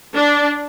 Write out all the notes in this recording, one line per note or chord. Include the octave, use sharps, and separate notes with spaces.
D4